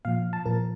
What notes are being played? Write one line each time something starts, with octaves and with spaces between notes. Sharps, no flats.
A#2 F3 F5
A5
A#2 F3 A#4